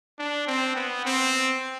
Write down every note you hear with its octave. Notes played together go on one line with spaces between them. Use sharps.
D4
C4
B3
C4